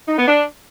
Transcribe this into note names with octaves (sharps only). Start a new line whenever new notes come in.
D#4
B3
D4